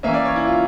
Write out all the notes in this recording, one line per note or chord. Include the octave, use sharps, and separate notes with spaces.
E3 A#3 C#4 E5
D5
C#5
E4
F4